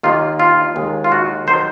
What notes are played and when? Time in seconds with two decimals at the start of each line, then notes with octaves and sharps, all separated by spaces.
0.03 D#2 D#3 A#3 F4
0.40 F4
0.76 D#2 D#3 G#3
1.04 F4
1.12 F#4
1.47 D#3 F#3 C5